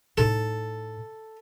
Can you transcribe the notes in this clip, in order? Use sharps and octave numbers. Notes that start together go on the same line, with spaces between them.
A2 D#4 A4